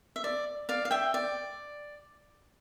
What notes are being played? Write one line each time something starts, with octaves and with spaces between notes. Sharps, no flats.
E5
D5
D5 F5
F5
E5 G5
D5